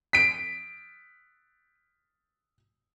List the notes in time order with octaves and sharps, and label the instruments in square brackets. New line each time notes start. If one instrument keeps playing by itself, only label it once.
[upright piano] B6 D7